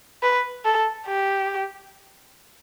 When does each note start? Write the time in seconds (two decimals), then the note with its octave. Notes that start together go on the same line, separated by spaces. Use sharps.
0.23 B4
0.65 A4
1.07 G4